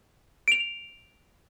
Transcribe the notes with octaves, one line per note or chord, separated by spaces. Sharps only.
D7 F7